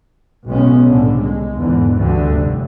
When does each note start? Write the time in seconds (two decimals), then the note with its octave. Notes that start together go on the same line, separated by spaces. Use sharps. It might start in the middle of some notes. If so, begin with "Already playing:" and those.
0.47 B1 A2 G#3 B3 C#4
0.85 C2 A2 D3
1.18 G#3
1.55 E2 G#2 D3
1.95 D2 G2 D3 A3
2.30 F1